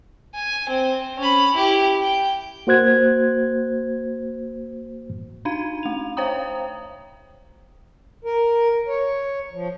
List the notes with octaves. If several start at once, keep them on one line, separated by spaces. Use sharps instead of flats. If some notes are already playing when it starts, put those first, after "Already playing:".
G#5
C4
C#4 B5
E4 G4
G5
A#3 F#4 C5 F#6 G#6
D4 D#4 F5 G#6 D#7
A3 F7
C5 C#5 F5 G5 A#5 D#6
A#4
C#5
F3